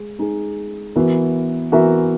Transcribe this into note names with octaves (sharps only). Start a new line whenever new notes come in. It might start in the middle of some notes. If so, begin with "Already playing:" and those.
Already playing: G#3
G#3 D#4 G#4
E3 B3 F#4 A#4 E5
E3 B3 F#4 A#4 E5